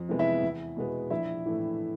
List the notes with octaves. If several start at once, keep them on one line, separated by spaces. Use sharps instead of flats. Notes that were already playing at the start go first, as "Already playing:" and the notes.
Already playing: F2
C3 E3 G#3 B3
E4 E5
E2
B2 G#3 B3
A#1 E4 E5
A2 E3 A3